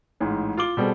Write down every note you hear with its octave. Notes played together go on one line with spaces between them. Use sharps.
A1 G#2
F4 D6 G7
B2 G3 C4 G#4 A4